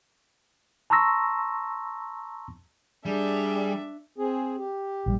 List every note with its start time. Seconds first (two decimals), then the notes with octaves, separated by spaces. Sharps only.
0.90 A5 A#5 C6 C#6 E6 A#6
3.05 G3 D4 G#4 E5
4.18 C4 G#4
4.57 G4
5.06 A#1 C#3 G3